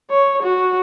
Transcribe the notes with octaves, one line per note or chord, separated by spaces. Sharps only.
C#5
F#4